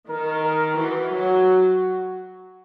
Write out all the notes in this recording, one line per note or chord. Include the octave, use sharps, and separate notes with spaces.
D#3 A#4
A#4
E3 F#4
F#3